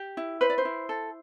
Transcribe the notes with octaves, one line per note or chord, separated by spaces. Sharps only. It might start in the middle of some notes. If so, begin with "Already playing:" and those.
Already playing: G4
E4
B4 C5
D5
C5
E4
A4